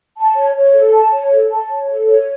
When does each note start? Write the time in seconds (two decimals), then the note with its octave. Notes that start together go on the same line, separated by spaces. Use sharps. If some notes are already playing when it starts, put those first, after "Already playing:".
0.18 A5
0.37 C#5
0.55 C#5
0.74 A4
0.93 A5
1.12 C#5
1.31 A4
1.50 A5
1.69 C#5
1.88 A4
2.07 C#5